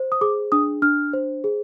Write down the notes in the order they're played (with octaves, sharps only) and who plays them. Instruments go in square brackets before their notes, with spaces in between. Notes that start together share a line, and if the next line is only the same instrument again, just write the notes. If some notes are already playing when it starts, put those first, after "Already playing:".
Already playing: [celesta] C5
D#6
G#4 D6
D4 D#6
D4 F6
C5
G#4